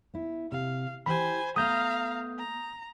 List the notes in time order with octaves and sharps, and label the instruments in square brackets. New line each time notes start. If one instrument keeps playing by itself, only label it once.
[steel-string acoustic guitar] B3 E4
[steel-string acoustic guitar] C3 [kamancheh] F5
[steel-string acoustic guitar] E3 G4 [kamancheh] C5 G#5 [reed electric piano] B5
[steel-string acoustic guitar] A3 B3 [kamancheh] F5 A#5 [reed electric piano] D#6 G6
[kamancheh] A#5